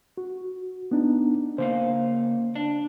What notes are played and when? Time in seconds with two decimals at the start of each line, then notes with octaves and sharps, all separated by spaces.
0.17 F#4
0.91 B3 D4 D#4
1.58 C#3 A#3 C5 F5
2.55 D4